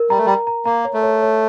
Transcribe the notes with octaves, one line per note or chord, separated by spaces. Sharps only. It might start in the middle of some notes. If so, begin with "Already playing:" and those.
Already playing: A#4
G3 A#5
A3
G3 A#5
A#5
A#3 A#5
C#5
A3
C#5
C#5